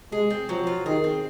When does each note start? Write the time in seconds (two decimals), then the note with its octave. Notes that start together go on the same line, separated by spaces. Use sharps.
0.12 G#3 G#4
0.30 C4
0.49 F3 F#3
0.67 F4
0.86 D#3 G#4
1.04 C4